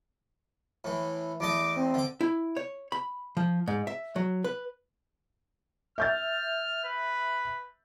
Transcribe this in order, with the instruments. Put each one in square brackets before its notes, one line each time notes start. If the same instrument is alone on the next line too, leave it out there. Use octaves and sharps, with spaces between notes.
[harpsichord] A2 E3
[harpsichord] E2 A3 D#5 [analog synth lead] D6
[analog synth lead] C4
[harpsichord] D3 D6
[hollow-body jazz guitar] E4
C#5
B5
F3
G#2
E5
F#3
B4
[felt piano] E5 G6 A6 [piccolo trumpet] F6
[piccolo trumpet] B4